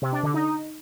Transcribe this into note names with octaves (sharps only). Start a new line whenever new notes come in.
C3
D4
D3
D#4